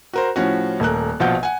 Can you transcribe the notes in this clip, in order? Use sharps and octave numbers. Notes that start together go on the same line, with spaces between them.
F#4 A#4 C5
A2 F3 C#4 F#4
D#1 A3 A#4 F#6
A#1 B2 F3 F4 F#5 G6
F#5 G#5